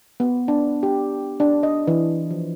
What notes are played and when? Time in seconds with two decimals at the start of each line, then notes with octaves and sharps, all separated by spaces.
0.20 B3
0.48 D4
0.83 G4
1.40 D4
1.63 D#5
1.87 E3
2.31 F3